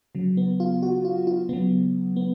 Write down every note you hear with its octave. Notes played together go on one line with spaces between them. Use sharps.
C#3 F#3
B3
F4
F#4
F4
F4
C#3 F#3 B3
B3